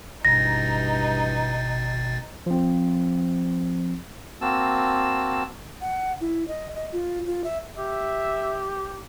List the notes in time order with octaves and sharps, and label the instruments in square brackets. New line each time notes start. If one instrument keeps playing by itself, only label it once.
[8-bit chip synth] G#1 B2 A6 [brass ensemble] G2 E3 A#5 [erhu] D#4 [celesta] A#6
[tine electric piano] F3 C4
[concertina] A#3 C4 F#4 A5 E6
[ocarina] F#5
E4
D#5
D#5
F4
F4
E5
[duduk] G4 [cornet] E5